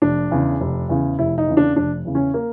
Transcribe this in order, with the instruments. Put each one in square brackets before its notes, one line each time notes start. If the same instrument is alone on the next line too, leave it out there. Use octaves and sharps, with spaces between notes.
[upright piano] F1 D4
E2 C#3
F1
E2 C#3
F1 E4
D#4
E2 C#3
D4
F1 D4
E2 C#3
C#4
A#3